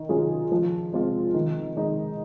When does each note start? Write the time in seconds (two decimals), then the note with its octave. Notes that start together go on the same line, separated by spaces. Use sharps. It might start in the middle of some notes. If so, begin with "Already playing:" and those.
Already playing: D#3
0.09 F#3 C#4 F4 G#4
0.52 F3
0.93 G#3 C4 F4
1.34 D#3
1.76 G#3 D#4